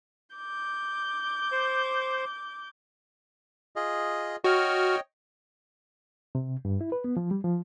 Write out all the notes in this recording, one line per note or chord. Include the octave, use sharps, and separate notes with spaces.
D6 G6
C5
F4 G#4 D#5
F#4 C#5 D#5 G5 F6
C3
G2
E4
B4
B3
F3
G3
F3